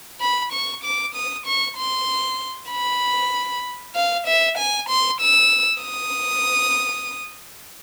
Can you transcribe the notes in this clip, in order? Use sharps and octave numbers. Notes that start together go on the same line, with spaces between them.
B5
C#6
D6
D#6
C#6
C6
B5
F5
E5
G#5
C6
E6
D#6